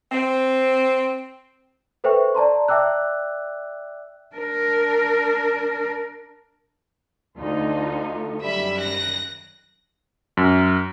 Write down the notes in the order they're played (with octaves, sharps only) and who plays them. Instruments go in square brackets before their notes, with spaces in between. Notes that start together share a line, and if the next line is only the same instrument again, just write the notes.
[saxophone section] C4
[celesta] A4 B4 C5 E5 G5 C#6
D5 A5 A#5 C6
D5 E5 G5 D6 E6 F#6
[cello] D4 A#4
[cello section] D2 D#4 F4 [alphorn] D4
[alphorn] A3
[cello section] F#2 D#3 [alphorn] G3 [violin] E5 B5
[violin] F#6 A#6
[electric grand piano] F#2